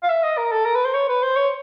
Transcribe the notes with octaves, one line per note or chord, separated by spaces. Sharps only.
F5
E5
D#5
A#4
A4
A#4
B4
C5
C#5
B4
C5
C#5